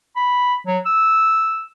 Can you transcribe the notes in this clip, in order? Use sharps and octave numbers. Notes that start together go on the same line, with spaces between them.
B5
F#3
E6